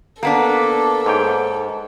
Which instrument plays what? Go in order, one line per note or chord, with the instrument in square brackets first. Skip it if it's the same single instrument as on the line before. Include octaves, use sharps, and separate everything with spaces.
[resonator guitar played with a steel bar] A#3 B3 D4 [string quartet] A4
[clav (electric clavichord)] G#2 C#5 G5